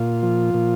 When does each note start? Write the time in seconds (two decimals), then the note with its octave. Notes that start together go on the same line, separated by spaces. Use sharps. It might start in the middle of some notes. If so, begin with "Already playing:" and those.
Already playing: A#2 F4
0.23 F3
0.54 A#2